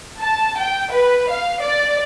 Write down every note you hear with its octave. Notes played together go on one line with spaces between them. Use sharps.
A5
G5
B4
F5
D5